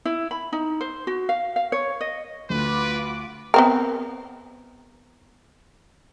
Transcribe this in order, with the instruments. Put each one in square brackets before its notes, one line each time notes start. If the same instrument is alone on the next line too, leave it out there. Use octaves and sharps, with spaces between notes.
[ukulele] E4
B5
D#4
C5
F#4
F5
F5
C#5
D#5
[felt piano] D2 [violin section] F4 F#4 D6 [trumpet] B4
[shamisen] B3 C4 A#4